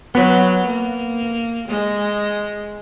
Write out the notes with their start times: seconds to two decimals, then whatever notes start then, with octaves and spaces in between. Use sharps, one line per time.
0.14 F#3 B3
0.66 A#3
1.69 G#3